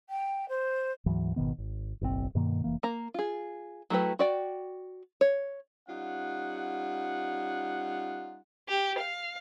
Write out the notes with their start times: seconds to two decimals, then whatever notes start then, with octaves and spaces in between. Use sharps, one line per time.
0.09 G5
0.49 C5
1.06 D2 G#2 E3 F#3
1.36 G#1 B2 D#3 B3
1.58 G#1
2.01 F#1 B1 C3 C4
2.35 G2 B2 D#3 A#3
2.64 F1 E3 A#3
2.83 A#3 A#5
3.14 F4 G#4
3.90 F#3 A3 E4 G4 B4
4.19 F#4 D5 G5
5.21 C#5
5.88 G3 C#4 D#4 F4 F#5
8.68 G4
8.99 F5